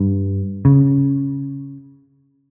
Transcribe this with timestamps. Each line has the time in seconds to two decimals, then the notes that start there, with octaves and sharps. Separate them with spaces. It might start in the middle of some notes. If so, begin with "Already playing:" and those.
Already playing: G2
0.65 C#3